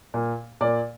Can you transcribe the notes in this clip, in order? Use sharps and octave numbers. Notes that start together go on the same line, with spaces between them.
A#2 A#3
A#2 A#3 D5